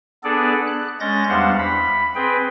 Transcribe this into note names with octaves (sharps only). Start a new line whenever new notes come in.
B3 D4 G#4 A4 D5
F#6
G#3 C#4 G6 A6 A#6
E2 G3 D4 C5 F5 F#5
B5
C4 G#4 B4 G5